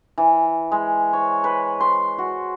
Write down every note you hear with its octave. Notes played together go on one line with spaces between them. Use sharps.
E3
G#3
C#5
B4
C6
F#4